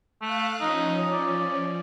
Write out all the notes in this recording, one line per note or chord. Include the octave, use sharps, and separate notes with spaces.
A3 F5 F#6
F3 C#4 D#4
D5